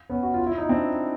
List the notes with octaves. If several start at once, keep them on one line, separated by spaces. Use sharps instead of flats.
B3 C#4
F#4
F4
E4
D#4
C4 D4